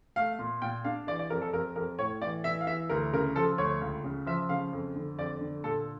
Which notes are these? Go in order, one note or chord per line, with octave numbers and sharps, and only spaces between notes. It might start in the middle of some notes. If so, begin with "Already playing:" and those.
A3 F5
A#2
A#2 G5
D4 F5
E3 D5
D5
F2 A#4
A4
F2 A#4
F2 A#4
A2 C#5
E3 D5
E3 E5
F5
E3 E5
D2 A#4
C#3 A#4
F3 A4
D2 C#5
C#2
C#3
F3 E5
C#3 F5
F2
D3
F2 D5
D3
A#2 A4